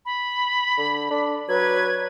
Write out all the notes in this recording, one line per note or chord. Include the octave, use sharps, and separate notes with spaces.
B5
D3
D4
F#3 B4 G#6